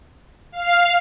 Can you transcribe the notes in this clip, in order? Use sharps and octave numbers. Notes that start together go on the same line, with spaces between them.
F5